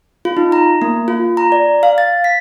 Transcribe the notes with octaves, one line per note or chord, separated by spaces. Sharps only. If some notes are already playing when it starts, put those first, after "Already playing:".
F4
D#4
A#5
A#3
F4
A#5
D5
F5
A6
B6